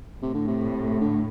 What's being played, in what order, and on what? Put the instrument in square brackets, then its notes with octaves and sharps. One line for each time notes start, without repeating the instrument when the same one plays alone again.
[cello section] A2 [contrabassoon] C3
[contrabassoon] D3
C3
D3